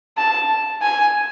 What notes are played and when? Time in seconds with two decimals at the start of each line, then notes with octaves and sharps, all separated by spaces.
0.18 A5
0.82 G#5